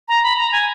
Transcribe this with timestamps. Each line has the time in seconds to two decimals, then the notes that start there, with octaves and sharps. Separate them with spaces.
0.08 A#5
0.23 B5
0.38 A#5
0.52 G#5